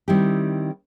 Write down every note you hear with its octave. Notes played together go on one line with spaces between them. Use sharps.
D#3 G3 C4 E4 G4